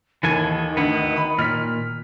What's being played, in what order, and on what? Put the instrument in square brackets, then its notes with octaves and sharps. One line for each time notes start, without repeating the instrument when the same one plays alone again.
[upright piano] D#2 [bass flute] D#3 [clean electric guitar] E3 A4 G#5
[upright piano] D2 [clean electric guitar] B3
[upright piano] B5
[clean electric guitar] A#2 [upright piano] F6 B6